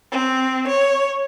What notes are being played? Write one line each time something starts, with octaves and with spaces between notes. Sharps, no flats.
C4
C#5